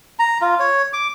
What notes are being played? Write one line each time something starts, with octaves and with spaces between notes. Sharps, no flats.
A#5
F4
C#5
D6